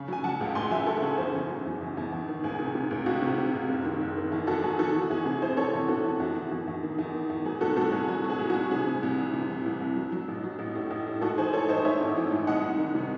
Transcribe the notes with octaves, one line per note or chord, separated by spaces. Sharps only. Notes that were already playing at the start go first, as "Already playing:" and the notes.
Already playing: C#3
F#3 G#5
F#3 F#5 A5
C#2
C#2 G#5 C6
F#3 E5 G#5
F#3 F#4 A4
C#3 G#4
E2 G#4 C5
E2
F#3
E2
E2
E2
E2
D#3
C#2 G#4
C3
C3
C#2
C#2 F#4
C3
C3
C#2
F#1
D#3
F#1
D#3
E2
E2 F#4 A4
F#3 G#4
D#3 F#4 A4
E3
F#4
E2 G#4
C3 G#4
E2 G#4 C5
E3 A4 C#5
E2
C3 F#4 A4
E3
E2 F#4
D#3
E2
E2
D#3
E2
D#3
E2
F#3 G#4
C2 F#4 A4
C2 F#4 A4
C2 G#4
F#3 F#4
F#3
G#4
C2
F#4
C2
C3 G#4
C3
C2
E3
C3
E3
C2
C2
F#3
F#3
A1
F#3
A1
A2
A1
A2
G#2 F#4 A4
E3 G#4 C5
E3 A4 C#5
G#2 C5 D#5
G#2 C#5 E5
G#1
E3
G#2
C2 D#5 F#5
C2
D#3
C3